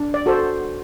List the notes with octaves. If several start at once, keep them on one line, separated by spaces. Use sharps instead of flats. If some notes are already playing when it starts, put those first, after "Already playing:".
Already playing: D4
D5
F#4 A4 C5